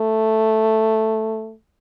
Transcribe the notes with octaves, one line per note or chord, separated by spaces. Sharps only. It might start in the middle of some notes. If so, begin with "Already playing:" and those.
Already playing: A3